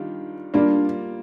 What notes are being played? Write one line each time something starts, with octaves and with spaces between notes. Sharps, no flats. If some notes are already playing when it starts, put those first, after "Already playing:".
Already playing: D#3 G3 D4 F4
G3 A#3 D4 F4